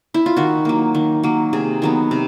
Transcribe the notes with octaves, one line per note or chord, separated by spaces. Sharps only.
E4
F4
D#3 F#4
F#3 A#3
D#3
F#3 A#3
C3 G#4
D#3 F#3 B3
C3